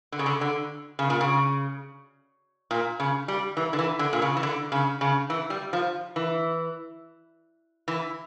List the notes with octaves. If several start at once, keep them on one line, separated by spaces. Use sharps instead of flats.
D3
C#3
D3
D3
C#3
A#2
C#3
A#2
C#3
G3
E3
D3
E3
D3
A#2
C#3
E3
D3
C#3
C#3
E3
G3
F3
E3
E3